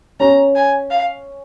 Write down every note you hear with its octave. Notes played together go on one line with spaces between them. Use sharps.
C#4 A#5
G#5
F5